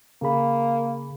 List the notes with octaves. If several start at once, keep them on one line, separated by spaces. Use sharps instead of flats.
C#3 A#3 G#4 B5